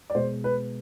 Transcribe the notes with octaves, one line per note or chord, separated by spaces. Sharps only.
D5
B2 G#3 C5
B4